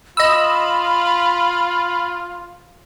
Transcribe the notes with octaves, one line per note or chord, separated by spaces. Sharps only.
F4 D#5 B5 E6